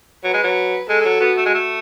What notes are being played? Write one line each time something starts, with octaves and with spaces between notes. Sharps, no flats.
F#3 B4
G#3
F#3
G#3 A4
G#3
F#3
B3 F#4
A3
G#3
A3